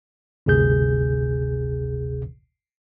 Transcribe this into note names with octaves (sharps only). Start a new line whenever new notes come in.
G1 D2 C3 G#4 G6